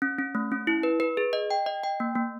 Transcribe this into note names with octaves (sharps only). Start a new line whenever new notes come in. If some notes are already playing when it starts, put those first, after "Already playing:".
C#4
C#4
A3
C#4
E4
B4
B4
G#4
D#5
G5
D#5
G5
A#3
A#3